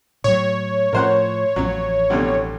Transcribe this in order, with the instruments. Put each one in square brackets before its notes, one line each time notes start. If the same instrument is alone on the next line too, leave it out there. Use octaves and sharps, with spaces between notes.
[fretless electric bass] A2 F#3 [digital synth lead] C#5
[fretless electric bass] A2 F3 [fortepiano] A#4 C5 F#5
[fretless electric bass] A1 F2 [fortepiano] F#3
[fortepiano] C2 B2 D3